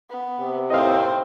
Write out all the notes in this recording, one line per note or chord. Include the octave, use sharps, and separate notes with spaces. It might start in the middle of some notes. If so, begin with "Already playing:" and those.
B3
C3
D#2 A2 C4 C5 D#5 F5